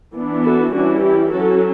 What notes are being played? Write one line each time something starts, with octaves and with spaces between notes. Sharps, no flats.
E3 B3 D4
F#4 A4
E3 G3 C#4 D4 F#4
E4 G4
F#3 C#4 F#4 A4